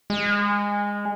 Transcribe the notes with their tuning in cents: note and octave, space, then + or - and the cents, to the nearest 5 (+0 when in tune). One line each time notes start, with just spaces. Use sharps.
G#3 -20